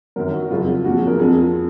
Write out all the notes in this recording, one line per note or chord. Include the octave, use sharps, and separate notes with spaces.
F#2 D#3 F#3 A#4
F#4
F2 C#3 F#3 F4
A#2 F3 F#4
G#4
A#4
F2 F3 G#4